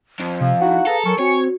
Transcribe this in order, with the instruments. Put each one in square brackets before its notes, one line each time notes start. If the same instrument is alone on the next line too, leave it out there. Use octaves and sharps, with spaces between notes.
[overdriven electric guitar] F2
[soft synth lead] C3 [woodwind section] F3 [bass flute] F5
[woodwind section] D#4 E4 F#4 [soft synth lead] F#5
[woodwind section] G#4 B4 A#5 [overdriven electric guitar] A4
[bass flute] F#3 [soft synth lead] A#4 [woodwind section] G#5 C#6
[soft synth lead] C4 [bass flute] F#4 [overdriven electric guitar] C#5